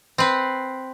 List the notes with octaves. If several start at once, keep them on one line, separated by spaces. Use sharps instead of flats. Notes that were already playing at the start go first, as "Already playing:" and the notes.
C4 B4